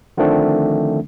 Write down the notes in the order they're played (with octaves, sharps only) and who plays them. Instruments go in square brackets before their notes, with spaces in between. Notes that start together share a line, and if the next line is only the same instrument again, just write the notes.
[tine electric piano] D3 D#3 F3 A3 C4 D4